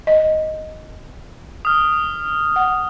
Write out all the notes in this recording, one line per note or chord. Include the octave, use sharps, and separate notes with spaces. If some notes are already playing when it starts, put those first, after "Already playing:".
D#5
D#6 F6
F#5